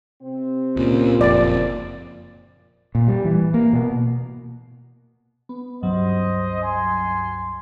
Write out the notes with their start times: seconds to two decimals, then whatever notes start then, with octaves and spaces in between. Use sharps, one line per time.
0.22 C3 C4
0.76 C#2 A#2 C#3
1.21 F#1 F2 D5
2.95 A#2
3.08 G3
3.25 E3
3.54 A#3
3.73 B2
5.49 B3
5.83 C#2 G2 F#3 C5 D#5
6.63 G#5 C6